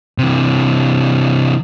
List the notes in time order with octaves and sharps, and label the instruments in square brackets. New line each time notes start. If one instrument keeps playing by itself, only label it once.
[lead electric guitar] C3 E3